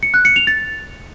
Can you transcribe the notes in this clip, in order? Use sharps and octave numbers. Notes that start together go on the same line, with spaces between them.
C#7
F#6
C#7
F7
A6